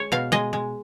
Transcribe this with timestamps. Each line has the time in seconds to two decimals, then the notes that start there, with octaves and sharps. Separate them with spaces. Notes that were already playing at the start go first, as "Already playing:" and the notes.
Already playing: G#3 C#5
0.12 B2 F5
0.32 G#3 D#5
0.53 G#3